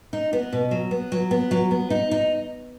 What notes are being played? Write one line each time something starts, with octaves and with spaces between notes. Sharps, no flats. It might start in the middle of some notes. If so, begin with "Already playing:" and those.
D#4
B3
B2
F#3
B3
F#3
B3
F#3
B3
D#4
D#4